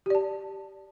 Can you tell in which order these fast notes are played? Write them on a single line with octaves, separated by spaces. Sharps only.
G4 D5 A5